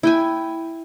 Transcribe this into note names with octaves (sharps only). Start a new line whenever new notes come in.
E4 G5 G#5